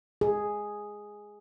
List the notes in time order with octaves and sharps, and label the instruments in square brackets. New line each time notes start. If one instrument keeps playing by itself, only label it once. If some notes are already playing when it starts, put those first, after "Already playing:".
[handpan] G#4